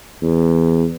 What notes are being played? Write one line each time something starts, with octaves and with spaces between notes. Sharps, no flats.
E2